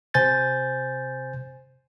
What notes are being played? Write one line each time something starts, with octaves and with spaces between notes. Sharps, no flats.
C3 C5 G#5 G6 A6